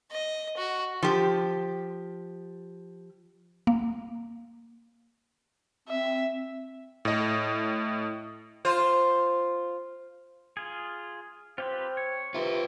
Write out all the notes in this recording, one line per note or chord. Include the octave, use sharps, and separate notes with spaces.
D#5
F#4
F3 G4
A#3
C4 E5
A2 D#5
F4 C5
F4 G#4
C4 F4 G4 B4
C#5
C3 F4 B4